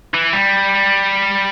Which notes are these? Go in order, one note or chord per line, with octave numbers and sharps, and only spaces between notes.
E3
G3